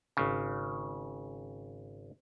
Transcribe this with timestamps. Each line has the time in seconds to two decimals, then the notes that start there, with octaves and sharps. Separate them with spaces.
0.17 G#1 C#3